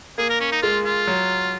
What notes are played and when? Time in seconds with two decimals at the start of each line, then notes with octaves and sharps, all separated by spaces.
0.18 A#3 G#4
0.30 A#4
0.40 C#4
0.52 D#4
0.62 G#3 F4
0.85 F4
1.07 F#3